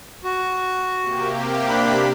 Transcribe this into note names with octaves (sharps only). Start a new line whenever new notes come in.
F#4
C3 A#3 G4
D4 B5